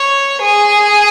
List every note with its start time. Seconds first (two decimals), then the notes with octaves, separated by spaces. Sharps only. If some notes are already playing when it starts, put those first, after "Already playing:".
Already playing: C#5
0.41 G#4